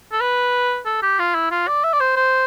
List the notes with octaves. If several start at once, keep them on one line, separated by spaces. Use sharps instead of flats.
A4
B4
A4
G4
F4
E4
F4
D5
E5
D5
C5
C5